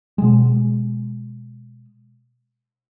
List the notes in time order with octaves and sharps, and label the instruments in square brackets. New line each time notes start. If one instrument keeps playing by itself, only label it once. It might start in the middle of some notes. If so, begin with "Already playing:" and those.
[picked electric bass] B2 G#3